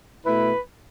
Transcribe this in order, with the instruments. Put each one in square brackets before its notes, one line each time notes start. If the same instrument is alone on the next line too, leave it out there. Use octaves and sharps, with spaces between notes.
[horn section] B2 A3 E4 B4